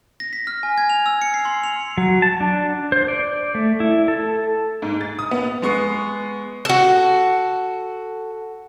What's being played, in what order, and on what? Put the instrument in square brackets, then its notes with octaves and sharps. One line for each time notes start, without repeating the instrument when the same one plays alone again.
[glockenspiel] A#6
B6
F6
G#5
G#6
F7
E6
C#7
C7
C6
F7
[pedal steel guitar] F#3
A5
D4
C5
D5
A3
E4
A4
[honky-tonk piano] G#2
A6
D#6
B3
[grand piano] G#3 B3 C#6 C7
[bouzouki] F#4 A4